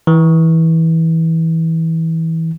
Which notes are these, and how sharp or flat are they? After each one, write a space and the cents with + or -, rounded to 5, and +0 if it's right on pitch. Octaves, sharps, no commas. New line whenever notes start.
E3 -20